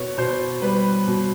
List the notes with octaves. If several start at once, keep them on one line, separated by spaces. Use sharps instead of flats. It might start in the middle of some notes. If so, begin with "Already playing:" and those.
Already playing: B2 B3 C#5
B2 C5
G3 B4
B2